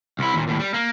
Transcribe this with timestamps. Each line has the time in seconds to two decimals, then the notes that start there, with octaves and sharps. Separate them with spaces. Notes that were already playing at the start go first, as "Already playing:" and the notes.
0.19 C2 E4
0.34 D#2 A#2
0.48 D#2 A2
0.59 G3
0.74 A#3